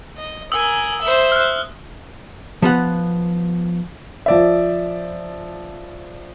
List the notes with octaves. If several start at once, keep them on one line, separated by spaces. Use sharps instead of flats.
D#5
A#4 G#5 D#6 E6
C5 E5
F6 F#6
F3 B3 F#5
F3 D5 E5